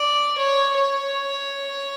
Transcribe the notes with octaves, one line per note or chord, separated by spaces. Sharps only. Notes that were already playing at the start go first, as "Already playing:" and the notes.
Already playing: D5
C#5
C#5